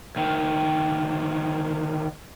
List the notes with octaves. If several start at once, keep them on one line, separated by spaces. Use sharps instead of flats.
D2 D#3